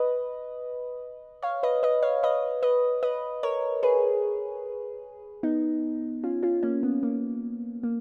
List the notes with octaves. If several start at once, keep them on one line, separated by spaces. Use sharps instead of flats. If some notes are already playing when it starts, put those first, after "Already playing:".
Already playing: B4 D#5
C#5 F5
B4 D#5
B4 D#5
C#5 F5
B4 D#5
B4 D#5
B4 D#5
A#4 C#5
G#4 B4
B3 D#4
C#4 F4
C#4 F4
A#3 C#4
B3
A#3
A#3